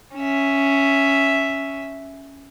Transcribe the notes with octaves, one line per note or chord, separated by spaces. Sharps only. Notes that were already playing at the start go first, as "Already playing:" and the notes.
C#4 E5